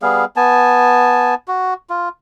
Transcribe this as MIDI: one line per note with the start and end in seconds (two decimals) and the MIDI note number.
0.02 0.25 55
0.02 0.25 59
0.02 0.25 68
0.02 0.25 77
0.36 1.34 59
0.36 1.34 80
0.36 1.34 81
1.48 1.74 66
1.90 2.09 65